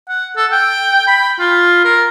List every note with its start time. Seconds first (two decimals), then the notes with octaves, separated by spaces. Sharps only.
0.09 F#5
0.36 A4
0.52 G5
1.07 B5
1.39 F4
1.85 A#4